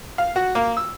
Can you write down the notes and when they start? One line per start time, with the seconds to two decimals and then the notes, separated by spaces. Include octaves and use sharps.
0.18 F5
0.36 F#4
0.55 A#3
0.77 E6